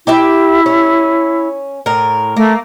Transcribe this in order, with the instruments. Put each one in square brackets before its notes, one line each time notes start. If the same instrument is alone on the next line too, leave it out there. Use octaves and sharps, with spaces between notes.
[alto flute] E4 [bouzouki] G4 E5 G5
[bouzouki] C#4
A2 A#4
[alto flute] A3 [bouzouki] A#3